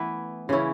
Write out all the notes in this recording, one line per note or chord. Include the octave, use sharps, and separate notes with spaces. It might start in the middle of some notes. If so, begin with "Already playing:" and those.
Already playing: E3 A3 B3 E4 B4
C#3 E3 C#4 E4